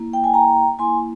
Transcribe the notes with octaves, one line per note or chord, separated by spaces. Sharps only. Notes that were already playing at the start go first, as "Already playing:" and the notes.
Already playing: A#3 E4
G5
G#5
G5 A#5
A#3 E4 G#5 C6